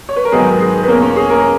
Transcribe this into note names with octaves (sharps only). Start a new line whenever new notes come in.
C#5
B4
A#4
G#2 D#3 F#3 B3 D#4 G#4
G#4
B4
E2 B2 A#3 C#4 A#4
C#4 C#5
G#4
A#3 A#4